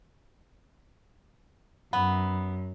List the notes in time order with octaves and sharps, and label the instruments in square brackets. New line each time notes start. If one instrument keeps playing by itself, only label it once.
[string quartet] F#2 [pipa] B3